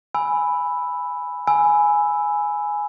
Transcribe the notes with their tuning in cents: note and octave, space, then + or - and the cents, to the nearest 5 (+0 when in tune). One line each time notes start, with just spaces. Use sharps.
G#5 +0 B5 +0 E6 +0
G#5 +5 B5 +0 E6 +0